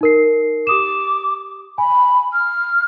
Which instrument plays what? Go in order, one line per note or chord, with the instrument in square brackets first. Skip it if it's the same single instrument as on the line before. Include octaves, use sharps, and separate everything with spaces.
[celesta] D#4 A#4 C7
[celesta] G4 D#6 E7 [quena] D6
[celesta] G#5 [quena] B5
[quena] F6